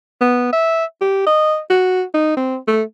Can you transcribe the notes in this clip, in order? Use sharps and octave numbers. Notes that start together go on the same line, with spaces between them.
B3
E5
G4
D#5
F#4
D#4
C4
A3